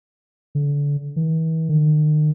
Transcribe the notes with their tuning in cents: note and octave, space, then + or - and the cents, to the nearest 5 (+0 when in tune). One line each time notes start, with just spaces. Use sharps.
D3 -30
E3 -40
D#3 -40